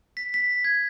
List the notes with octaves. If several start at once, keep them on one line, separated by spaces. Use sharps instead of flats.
B6
B6
G#6